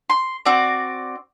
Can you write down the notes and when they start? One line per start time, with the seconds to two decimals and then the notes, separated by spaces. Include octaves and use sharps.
0.10 C6
0.45 C4 F#4 D5